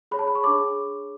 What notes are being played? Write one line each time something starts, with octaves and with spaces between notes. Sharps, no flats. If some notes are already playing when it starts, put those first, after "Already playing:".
G#4 C#5 B5
A5
B5
C#6
D4 G#4 C#5 D6